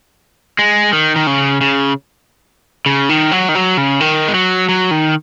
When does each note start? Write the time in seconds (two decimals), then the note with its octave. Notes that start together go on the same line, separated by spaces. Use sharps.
0.59 G#3
0.93 D#3
1.16 D#3
1.27 C#3
1.61 C#3
2.86 C#3
3.09 D#3
3.32 F#3
3.49 D#3
3.55 F#3
3.77 C#3
4.00 D#3
4.28 G#3
4.34 F#3
4.69 F#3
4.91 D#3